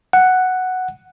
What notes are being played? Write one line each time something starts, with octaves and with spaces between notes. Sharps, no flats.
F#5